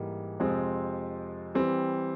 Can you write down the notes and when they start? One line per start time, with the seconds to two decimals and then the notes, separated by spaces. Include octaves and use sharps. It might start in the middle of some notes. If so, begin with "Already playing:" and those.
Already playing: G#2 E3 G3 A#3
0.40 F2 C3 F3 G#3 C4
1.55 E3 G3 C4